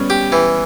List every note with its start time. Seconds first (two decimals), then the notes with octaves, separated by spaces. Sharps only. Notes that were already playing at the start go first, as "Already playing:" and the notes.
Already playing: G3 B3 C#4
0.10 G4
0.32 E3